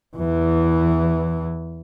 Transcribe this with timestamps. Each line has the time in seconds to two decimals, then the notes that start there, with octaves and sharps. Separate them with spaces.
0.16 E2 E3